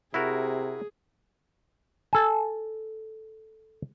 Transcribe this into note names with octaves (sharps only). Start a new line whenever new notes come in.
C3 E4 F#4 G#4 A#4
A4 G#5